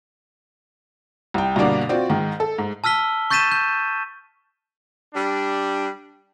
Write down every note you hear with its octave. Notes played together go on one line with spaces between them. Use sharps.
C2 G5
G2 B2 D3 A#3 D4
C4 F4 F#4 D5
G#2 D#3
A4
G#2
A5 E6 F6 B6 G7
C#6 G6 A6 B6 D#7 E7
G6
G3 D4